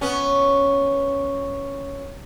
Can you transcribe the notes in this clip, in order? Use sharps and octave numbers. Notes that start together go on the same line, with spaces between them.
B3 C#4